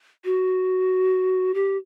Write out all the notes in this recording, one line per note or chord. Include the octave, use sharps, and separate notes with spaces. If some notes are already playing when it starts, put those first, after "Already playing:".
F#4
G4